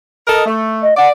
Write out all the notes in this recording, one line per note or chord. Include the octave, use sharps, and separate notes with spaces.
A4 A#4 D#5
A3
D#5
D5 F#5